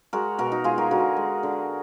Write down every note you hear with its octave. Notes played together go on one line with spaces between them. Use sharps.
G#3 F#4 A#4
B2 F#4 A#4
D#4 F#4
G#3 F4 G#4
F#4 A#4
D3 F#4 A#4
G#3
D3